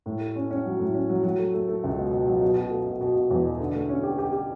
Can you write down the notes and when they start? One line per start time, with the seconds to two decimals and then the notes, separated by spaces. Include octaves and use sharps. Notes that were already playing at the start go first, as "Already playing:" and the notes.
0.06 A2
0.20 A3
0.36 C#4
0.51 C#4
0.65 F#3
0.79 A2
0.94 C#4
1.09 F#3
1.24 F#3
1.39 A3
1.54 A3
1.69 A3
1.84 C#2
1.97 B2
2.13 B2
2.27 F#3
2.42 B2
2.56 B2
2.71 A3
2.87 B2
3.01 B2
3.16 B2
3.30 E2
3.45 B2
3.60 D3
3.75 A3
3.89 C#4
4.03 G4
4.18 G4
4.33 G4